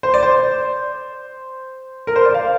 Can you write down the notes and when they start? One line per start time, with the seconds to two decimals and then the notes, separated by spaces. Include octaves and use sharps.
0.03 C5
0.14 D5
0.23 C5
2.07 A#4
2.16 C5
2.25 D5
2.34 F5